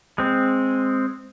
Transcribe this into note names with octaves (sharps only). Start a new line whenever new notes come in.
G#3 C4